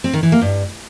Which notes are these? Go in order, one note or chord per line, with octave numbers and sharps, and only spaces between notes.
C4
D#3
E3
A#3
G2